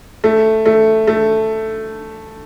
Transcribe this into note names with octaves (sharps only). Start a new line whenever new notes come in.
A3
A3
A3